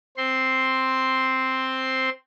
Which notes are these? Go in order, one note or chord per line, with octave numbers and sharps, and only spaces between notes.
C4 C6